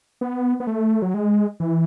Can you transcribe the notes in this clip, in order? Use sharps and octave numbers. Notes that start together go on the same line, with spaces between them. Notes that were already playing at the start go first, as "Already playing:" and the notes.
B3
B3
A3
F#3
G#3
E3